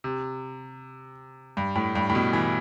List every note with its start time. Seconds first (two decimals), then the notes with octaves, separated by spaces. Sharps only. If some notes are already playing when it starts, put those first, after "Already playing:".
0.04 C3
1.57 G2
1.76 A2
1.95 G2
2.10 A2
2.15 B2
2.33 E3